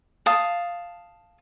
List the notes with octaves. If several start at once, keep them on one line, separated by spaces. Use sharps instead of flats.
F5 A5 D#6